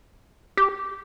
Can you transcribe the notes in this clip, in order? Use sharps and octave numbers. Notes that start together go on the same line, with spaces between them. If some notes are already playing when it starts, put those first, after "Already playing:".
G4